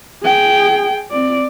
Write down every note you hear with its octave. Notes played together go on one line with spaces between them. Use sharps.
G#4 G5
C4 D5